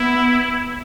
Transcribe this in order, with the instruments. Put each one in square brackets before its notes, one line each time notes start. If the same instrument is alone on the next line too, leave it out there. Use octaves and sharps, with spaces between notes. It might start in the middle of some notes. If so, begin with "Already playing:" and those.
Already playing: [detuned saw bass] B3 [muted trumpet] E4